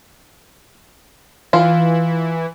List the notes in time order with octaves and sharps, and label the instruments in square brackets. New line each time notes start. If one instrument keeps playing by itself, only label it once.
[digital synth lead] E3 [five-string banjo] F4